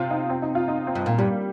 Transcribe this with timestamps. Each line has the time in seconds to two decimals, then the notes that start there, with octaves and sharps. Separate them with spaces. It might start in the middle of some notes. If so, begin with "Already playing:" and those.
Already playing: C3 C4 F4
0.10 D#4
0.30 C4
0.42 D#4
0.55 F4
0.68 D#4
0.87 C4
0.95 G2
1.06 A#2 A#3
1.18 G2 G3
1.31 A#3